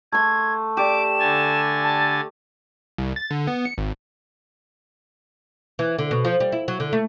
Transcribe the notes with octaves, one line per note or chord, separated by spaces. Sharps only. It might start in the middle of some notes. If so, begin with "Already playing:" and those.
A3 C6 G#6
G4 D5 D6 E7
D3 G#5 A6
A5
C2
A6
D3
B3
C#7
G#1
E3
D3
B2
F3
G3
E4
F#3
D3
A3